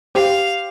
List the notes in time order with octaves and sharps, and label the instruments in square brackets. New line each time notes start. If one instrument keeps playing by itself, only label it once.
[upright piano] G4 C5 [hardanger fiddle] F5